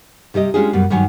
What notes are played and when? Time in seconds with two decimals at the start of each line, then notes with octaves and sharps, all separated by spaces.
0.34 C3 G3 G4 D#5
0.54 G#3 C#4 D4 F4 G4 G#4
0.73 F#2 B2 G3
0.90 G2 D#3 F#3 C#5 G#5